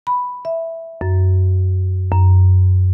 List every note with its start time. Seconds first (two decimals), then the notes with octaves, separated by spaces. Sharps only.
0.07 B5
0.45 E5
1.01 F#2
2.12 F#2